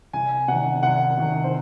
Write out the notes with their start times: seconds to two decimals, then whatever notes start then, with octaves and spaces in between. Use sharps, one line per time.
0.13 C2 G#5
0.48 C3 D#3 F#5
0.82 C2 F#5
1.18 C3 D#3
1.44 C5